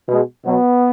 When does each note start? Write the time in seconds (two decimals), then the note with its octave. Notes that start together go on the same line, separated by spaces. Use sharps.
0.08 B2 G#3
0.44 B2 F#3 B3